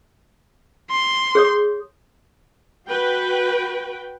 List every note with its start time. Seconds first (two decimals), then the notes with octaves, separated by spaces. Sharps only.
0.91 C6
1.35 G#4 C#5 D#6
2.88 F#4 B4 G5